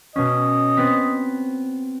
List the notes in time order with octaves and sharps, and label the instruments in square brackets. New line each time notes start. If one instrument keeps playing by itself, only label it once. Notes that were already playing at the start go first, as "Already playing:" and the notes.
[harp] B2 C#4 [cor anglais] D#5
[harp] B3 C4 B6